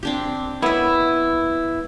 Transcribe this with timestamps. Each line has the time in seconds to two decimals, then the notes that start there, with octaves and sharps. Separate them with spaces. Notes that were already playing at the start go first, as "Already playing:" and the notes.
0.03 C4 D4 G4
0.62 B3 E4 C#5 E5